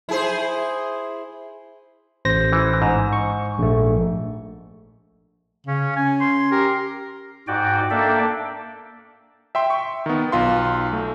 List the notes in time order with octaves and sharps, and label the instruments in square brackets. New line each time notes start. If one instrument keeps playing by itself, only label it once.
[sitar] E4 G#4 C5
[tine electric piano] A1 C5 A#6
[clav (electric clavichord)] E3
G#2
[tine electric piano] C#6
A#1 A3
[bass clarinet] C#3 [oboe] C#4
[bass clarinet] C#4 [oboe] G#5
[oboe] C6
[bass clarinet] G4 [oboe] A#4
[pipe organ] G#2 F#4 D5 G5
A#3 D4 A4 D5 E5 G5
[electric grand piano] E5 G5 C6
C#6
D#3 B3
B1 F4 C6
A3